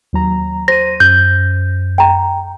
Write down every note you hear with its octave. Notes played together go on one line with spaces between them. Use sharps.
D#2 F#3 A#5
C5 A#6 D#7
F#2 G6
G5 A#5